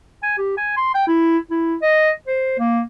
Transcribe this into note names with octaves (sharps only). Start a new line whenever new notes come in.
G#5
G4
G#5
C6
G5
E4
E4
D#5
C5
A#3